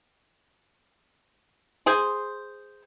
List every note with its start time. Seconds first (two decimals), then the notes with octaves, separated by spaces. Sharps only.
1.86 G#4 C5